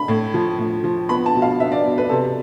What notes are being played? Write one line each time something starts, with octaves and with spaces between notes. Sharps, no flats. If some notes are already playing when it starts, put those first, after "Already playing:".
Already playing: B5
A2
F3
A2
F3
B3 B5
A5
B2
F5
B3 E5
D5
B2
B4
C3 A4